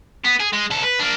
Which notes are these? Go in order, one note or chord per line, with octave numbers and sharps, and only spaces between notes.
B3
G#4
G#3
C2 A4
B4
A#3 D4